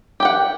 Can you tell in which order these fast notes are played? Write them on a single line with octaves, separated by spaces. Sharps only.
G4 G5 F#5